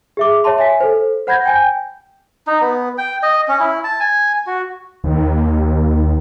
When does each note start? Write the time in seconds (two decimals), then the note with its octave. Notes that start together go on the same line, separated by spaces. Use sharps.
0.17 G#4 E5 D6
0.44 C#5 E5 A5 C6
0.58 E5 G#5 B6
0.81 A4 C5
1.27 C5 F#5 B5 G6 G#6 A#6
1.46 G5 G#5 G6
2.47 D#4
2.61 B3
2.98 G5
3.23 D#5
3.48 C#4
3.60 E4
3.84 A5
4.00 G#5
4.47 F#4
5.04 D#2